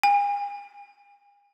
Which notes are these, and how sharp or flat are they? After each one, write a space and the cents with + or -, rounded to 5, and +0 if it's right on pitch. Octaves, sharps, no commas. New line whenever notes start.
G#5 -40